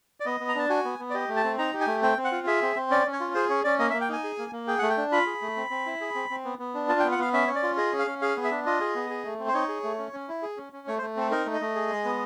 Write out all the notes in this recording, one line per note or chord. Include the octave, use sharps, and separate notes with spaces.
D5
B3 D#5
B3
A#5
D4 A5
F#4 G#5
B3
B3
D5
G4 D#5
A3
A5
C4
D#4 A#5
G4
G#5
A3
C4 G5
C4
F#5
F4
G#4 E5
C4
C4
C#4 D5
C#4
C#5
F4
G#4 C5
C#4 C#5
C#4 D5
A#3 D#5
E5
A#3
G5
D#4 G#5
G#4
A#3
A#3
G#4 G5
A3 F#5
G5
D4
F4 B5
G#4
A3
C4
C4
E4
G#4
C4
C4
B3
B3
D4
F4 A5
G5
B3
F#5
B3 F5
C#4 E5
C#4 C#5
D5
F4
G#4 D#5
C#4
F5
C#4
G#4 F5
B3
E5
D4
F4 D#5
G#4
B3
G#4
A3
C4
C5
D#4 C#5
G#4
A3
C#4
C#4
E4
G#4
C#4
C#4
A3 C#5
C5
A3
C4 A4
D#4 A#4
A3
D#5
A3
G#4
G#3
B3